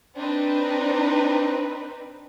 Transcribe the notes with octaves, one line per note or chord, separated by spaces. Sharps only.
C4 D4 D#4 B4